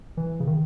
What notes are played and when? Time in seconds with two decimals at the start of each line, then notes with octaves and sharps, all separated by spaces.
0.17 E3
0.40 C#3
0.47 D#3